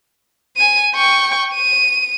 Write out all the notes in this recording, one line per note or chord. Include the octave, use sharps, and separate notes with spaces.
G#5 D#7
G5 C#6
D#7